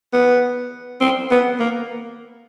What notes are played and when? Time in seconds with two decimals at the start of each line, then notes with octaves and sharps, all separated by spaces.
0.13 B3
1.01 C4
1.31 B3
1.60 A#3